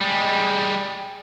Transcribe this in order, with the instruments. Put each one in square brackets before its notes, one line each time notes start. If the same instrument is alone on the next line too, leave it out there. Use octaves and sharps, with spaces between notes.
[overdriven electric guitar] G3 G#3